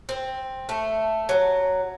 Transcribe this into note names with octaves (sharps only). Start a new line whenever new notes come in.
C4
A3
F#3